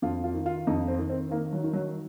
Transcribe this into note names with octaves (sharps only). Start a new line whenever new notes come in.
F2 F4
F4
D#3
F4
F2 D#4
C4
D#3
C4
D#3 A#3
F#3
D#3
F#3